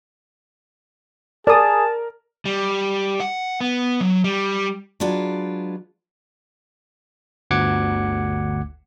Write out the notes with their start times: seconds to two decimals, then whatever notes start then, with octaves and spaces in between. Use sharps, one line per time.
1.47 G#4 A#4 D5 A5 D#6
2.45 G3
3.20 F#5
3.61 B3
4.01 F#3
4.24 G3
5.00 F#3 G#3 D4 F4 B4
7.51 G1 D2 F#5 D6 G#6 C#7